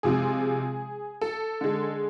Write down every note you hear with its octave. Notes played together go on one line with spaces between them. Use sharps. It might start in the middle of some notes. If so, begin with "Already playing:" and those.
C3 F3 G#3 G#4
A4
D3 G#3